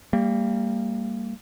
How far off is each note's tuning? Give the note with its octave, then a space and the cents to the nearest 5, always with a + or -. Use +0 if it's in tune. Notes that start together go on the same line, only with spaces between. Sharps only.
G3 +20 A#3 -25